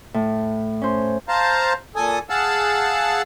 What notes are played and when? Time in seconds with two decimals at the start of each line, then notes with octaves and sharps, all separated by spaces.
0.14 A2
0.82 C#4 C5
1.28 C5 F5 A5 A#5
1.96 A#2 A4 G#5 D#6
2.30 G#4 F5 F#5 A5 E6